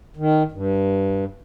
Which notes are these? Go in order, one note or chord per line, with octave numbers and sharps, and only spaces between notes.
D#3
G2